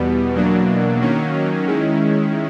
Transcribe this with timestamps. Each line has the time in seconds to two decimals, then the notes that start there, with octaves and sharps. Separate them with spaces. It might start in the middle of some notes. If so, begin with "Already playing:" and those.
Already playing: E2 B2 G3 B3
0.34 E2 B2 F#3 A#3 D4
1.01 D#3 F#3 A#3 C#4
1.67 D#3 G#3 C#4 E4